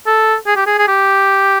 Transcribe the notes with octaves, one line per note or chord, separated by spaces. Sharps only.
A4
G#4
G4
G#4
G#4
G4